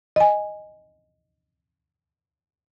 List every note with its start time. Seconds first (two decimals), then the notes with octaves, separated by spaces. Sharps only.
0.16 D#5 G#5